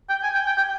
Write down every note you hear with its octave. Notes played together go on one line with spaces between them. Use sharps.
G5
G#5
G5
G5
G5